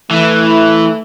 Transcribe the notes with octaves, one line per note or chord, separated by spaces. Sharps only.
E3 A3